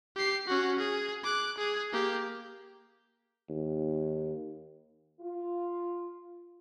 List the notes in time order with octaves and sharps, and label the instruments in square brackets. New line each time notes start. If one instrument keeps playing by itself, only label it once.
[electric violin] G4 C7
C#4 F#4
G#4
D6 F#6
G#4
A#3 G4
[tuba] D#2
[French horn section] F4